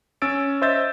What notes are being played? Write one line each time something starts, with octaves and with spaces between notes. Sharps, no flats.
C#4 C#5 E6 A6 D7
C5 D#5 E5 E6 G6 A6